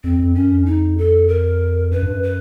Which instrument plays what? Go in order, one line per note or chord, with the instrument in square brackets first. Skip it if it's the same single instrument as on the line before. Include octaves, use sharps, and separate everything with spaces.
[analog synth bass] F2 [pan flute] C4
[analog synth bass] F2
[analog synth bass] F#2 [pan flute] C#4
[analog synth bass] F2
[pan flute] D#4
A4
A#4
[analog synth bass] F#2 [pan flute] B4
[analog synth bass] G2
F#2
[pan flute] B4